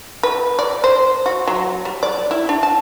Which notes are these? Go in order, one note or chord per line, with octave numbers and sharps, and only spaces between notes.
B4
D5
C5
F#4
F#3
G3
D5
E4
D4
A5